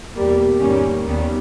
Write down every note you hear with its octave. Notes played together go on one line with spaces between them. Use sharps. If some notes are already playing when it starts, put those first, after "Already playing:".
E2 B2 G3 A#3
G#2 D#3 G3 A#3 C#4
D#2 D#3 G3 B3